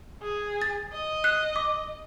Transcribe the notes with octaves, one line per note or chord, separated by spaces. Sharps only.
G#4
A6
D#5
F#6
D6